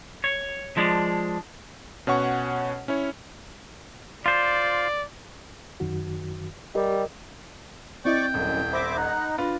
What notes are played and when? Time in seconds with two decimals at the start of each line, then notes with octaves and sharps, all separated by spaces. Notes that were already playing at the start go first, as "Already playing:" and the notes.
0.24 C#5
0.77 F3 G#3 D4
2.07 B2 C#4 C#5 F#5 C#6
2.88 C#4 E4 C#5
4.26 F4 C5 D5
5.80 F#2 D#3 F#4
6.75 G3 G4 A#4 D#5
8.05 C4 E4 D5 D#5 G5 C#6 D6
8.34 D#1 F#2
8.73 C5 E5 B5 D6 A#6
8.97 D#4 F#5
9.38 D4 F4 B4